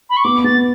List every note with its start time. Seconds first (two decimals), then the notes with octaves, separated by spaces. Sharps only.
0.10 B5
0.17 C#6
0.24 B3 D6
0.44 B3 A6